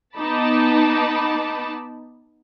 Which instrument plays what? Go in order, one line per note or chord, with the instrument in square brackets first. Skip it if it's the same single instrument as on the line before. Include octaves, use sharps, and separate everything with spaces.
[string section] B3 D#4 A5 B5 D6